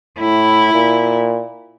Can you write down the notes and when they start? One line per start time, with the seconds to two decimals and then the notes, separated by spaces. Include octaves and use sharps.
0.19 A2 E4
0.73 A#2